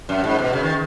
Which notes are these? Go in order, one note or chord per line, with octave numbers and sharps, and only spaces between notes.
F#2
G#2
B2
C#3
D#3